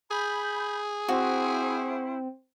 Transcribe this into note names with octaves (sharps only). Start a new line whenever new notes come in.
G#4 B5 G6
C4 E4 F#4 C5